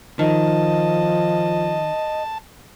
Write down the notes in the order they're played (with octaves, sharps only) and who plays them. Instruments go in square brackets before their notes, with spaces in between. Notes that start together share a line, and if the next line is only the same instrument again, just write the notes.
[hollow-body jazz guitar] D#3 [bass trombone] F3 [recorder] D#5 [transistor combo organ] A5